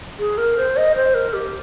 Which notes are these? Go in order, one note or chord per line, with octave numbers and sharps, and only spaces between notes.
G#4
A#4
C5
D#5
C5
A#4
G4